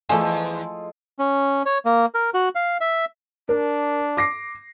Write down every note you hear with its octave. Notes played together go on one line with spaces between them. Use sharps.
E2 F3 G#3 A3 F4 A4 D5 G#5
C#4
C#5
A#3
A#4
F#4
F5
E5
D4 A#4
D6 A#6 C7